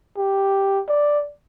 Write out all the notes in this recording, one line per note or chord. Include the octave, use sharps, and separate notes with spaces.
G4
D5